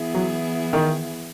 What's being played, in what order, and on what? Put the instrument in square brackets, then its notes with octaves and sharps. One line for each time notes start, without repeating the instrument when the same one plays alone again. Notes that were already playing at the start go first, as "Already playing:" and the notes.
Already playing: [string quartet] E3 B3 E4 G#4
[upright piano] F#3
D#3